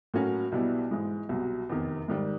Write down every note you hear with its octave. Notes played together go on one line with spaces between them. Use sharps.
A2 F#3 A#3 C#4 F#4
B1 B2 G3 B3 E4
G#2 E3 G#3
C2 B2 F#3
F1 E2 C3 D#3
G#2 D#3 G3